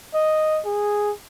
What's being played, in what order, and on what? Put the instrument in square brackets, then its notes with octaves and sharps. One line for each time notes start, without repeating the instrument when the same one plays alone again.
[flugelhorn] D#5
G#4